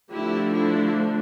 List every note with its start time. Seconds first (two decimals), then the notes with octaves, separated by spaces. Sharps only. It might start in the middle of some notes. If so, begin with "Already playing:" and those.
0.11 D3 F3 A3 D4 E4 G4
0.52 E4